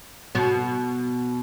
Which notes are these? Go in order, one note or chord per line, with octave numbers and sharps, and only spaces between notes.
B2 B3